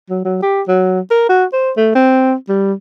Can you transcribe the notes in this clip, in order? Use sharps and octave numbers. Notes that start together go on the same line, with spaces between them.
F#3
F#3
G4
F#3
A#4
F#4
C5
A3
C4
G3